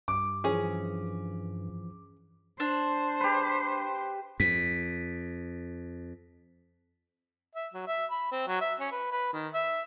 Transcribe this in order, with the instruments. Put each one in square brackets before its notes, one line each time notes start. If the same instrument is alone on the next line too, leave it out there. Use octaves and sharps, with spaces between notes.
[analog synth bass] G2 [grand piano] D6
[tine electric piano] E3 F3 [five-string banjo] C#4 G#4
[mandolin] D4 [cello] C5
[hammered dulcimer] G4 B4
[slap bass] F2 [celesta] B6
[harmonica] E5
F#3
E5
B5
C4
F#3
E5
C#4
B4
B4
D#3
E5